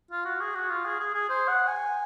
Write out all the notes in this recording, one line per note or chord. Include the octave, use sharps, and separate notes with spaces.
F4
F#4
G#4
F#4
F4
G#4
G#4
G#4
C5
F#5
G#5